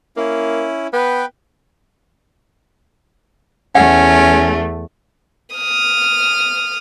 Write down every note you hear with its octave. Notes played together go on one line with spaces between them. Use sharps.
A#3 C#4 E4
B3 B4 G5
E2 A3 C#4 F#5
D#6 F6